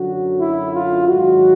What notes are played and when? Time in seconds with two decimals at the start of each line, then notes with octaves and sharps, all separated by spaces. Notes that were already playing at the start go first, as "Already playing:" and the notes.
Already playing: F#2 D3 F#3 F#4
0.40 E4
0.73 F4
1.08 G#2 D#3 F#3 F#4